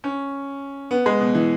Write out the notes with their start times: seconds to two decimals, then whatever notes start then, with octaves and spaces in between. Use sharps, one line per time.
0.04 C#4
0.91 B3
1.06 G#3
1.20 B2
1.35 E3